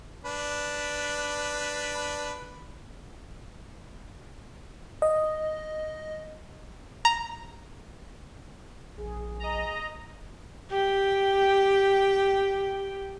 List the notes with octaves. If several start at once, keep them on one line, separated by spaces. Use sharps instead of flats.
D4 B4
D#5
A#5
A#1 G#4
D#5 A#5
G4 G5